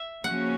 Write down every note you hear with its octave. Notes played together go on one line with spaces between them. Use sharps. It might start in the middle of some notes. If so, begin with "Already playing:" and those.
Already playing: E5
C#3 F3 A#3 C#4 F#4 F#5